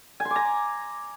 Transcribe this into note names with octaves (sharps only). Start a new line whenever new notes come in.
G#5
C6
D6
A#5